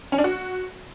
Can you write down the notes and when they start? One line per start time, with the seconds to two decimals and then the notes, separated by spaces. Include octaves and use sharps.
0.12 C#4
0.18 D4
0.24 F#4